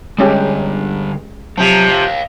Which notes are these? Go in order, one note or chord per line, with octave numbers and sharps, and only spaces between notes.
D3 G3 G#3 C#4 G4
C3 F3 F#3
D#5 F5